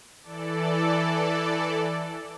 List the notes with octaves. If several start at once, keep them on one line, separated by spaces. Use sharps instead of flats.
E3 A4 D5